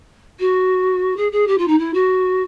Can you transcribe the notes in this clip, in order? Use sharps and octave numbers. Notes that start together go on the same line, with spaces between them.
F#4
G#4
G#4
G4
F4
D#4
E4
F#4